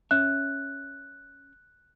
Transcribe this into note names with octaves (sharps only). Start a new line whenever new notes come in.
C#4 E5 F#6